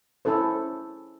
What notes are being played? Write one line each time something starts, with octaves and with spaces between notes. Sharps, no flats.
C#4 E4 A4 C5